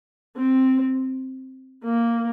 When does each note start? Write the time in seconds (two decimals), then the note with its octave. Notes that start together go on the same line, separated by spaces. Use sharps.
0.36 C4
1.84 A#3